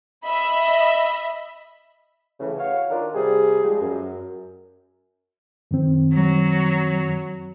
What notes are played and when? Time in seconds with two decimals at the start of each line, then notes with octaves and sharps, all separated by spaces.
0.25 D#5 E5 B5
2.40 A2 C#3 E3
2.58 F#4 C#5 F5
2.90 D#3 D4 F4 A#4
3.14 C3 G3 G#4
3.64 F3 G3 G#3
3.80 F#2
5.71 F#2 D#3 C4
6.13 F#3